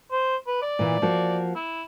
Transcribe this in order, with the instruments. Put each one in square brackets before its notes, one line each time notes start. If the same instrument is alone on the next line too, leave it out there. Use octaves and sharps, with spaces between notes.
[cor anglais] C5
B4
D5
[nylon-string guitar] A#2 E3
F3 A#3 F#4
[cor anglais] E4